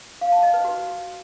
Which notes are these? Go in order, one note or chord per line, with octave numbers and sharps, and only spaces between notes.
F5
A5
D#5
B4
F#4